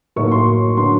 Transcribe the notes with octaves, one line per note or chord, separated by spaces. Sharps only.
A2 F#3 A#3 D#4 C#6
C6
D3 F#3 B3 C6